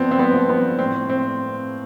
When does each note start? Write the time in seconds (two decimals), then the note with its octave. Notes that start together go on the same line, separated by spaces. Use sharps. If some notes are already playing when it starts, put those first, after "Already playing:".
Already playing: G2 F3 B3 C4
0.11 C4
0.19 B3
0.33 F3
0.49 B3
0.79 A2 C4
1.09 C4